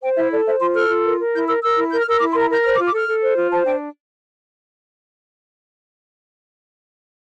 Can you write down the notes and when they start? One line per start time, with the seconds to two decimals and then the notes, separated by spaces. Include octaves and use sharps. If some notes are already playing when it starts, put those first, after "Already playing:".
0.02 C5 G5
0.17 E4 E5
0.31 A4 D5
0.46 C5 E5
0.61 F4 C6
0.76 A4 F6
0.89 F4
1.04 A#4
1.19 A#4
1.34 E4 G6
1.47 A#4 E6
1.63 A#4 E6
1.76 E4
1.90 A#4 G6
2.00 F6
2.06 A#4 E6
2.20 E4 D6
2.32 A#4 C6
2.42 A#5
2.50 A#4 G6
2.64 C5 F6
2.75 D6
2.79 F4
2.86 D6
2.93 A4 F6
3.08 A4
3.22 C5
3.36 F4
3.51 C5 A5
3.66 D4 G5